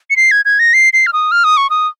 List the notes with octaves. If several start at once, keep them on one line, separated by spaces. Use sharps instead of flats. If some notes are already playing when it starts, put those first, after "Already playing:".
C#7
C7
G#6
G#6
A#6
C7
C7
F6
D#6
F6
D#6
C#6
D#6